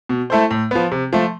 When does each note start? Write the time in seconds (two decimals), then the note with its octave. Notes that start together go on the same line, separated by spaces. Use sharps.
0.09 B2
0.30 A3 E4 A4 C5
0.51 A2
0.71 F3 B3
0.92 C3
1.13 F3 A3